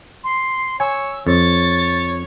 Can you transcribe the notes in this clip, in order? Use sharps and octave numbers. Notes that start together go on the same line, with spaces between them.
C6
C#5 G#5 E6
F2 C#5 A6